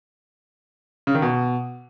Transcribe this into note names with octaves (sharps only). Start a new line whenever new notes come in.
C#3
D#3
B2